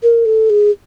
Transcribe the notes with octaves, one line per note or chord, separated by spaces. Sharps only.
A#4
A4
G#4